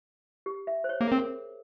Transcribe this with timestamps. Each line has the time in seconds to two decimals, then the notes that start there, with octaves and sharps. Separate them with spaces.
0.46 G4
0.67 E5
0.84 C5
0.89 C#5
1.01 A#3 G#4
1.12 C4 A#4